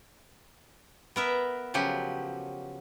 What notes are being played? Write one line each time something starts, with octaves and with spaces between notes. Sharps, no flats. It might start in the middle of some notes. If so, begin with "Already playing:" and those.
B3 A#4 E5
C#3 F3 F#3 G4